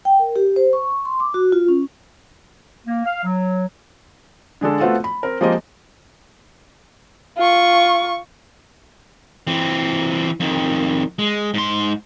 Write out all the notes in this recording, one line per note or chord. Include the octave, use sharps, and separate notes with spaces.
G5
A#4
G4
C5
C#6
C#6
C6
D6
F#4
F4
C#4
A#3
F5
F#3
D3 G#3 D4 A4
A3 B3 C4 F4 F#4 A4
B5
C4 A#4
F3 G#3 A#3 C4 G4 D#5
F4 C#6
E3 C4
F2 D#3
G#3
G#2 C6